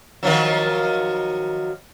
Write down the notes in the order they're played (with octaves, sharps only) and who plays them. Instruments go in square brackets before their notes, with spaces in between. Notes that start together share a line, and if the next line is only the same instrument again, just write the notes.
[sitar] D#3 F3 F#3